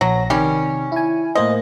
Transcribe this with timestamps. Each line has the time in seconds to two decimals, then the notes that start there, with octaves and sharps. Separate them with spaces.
0.01 A#1 F#3 A#6
0.30 C3 D#3 G3 C#4
0.92 E4 G#5
1.35 A2 A#3 C5 D#5